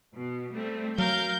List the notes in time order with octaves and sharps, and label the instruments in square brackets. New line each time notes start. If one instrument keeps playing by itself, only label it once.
[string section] B2
G3 A3 C4
[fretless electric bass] F#3 [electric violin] A#4 F5 [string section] G6